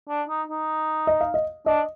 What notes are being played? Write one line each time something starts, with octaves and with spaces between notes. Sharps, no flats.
D4
D#4
D#4
D#5
F5
D#5
D4 D#5